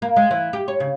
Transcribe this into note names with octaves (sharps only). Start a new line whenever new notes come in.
A#3
G#3
E3
G4
C#5
C#3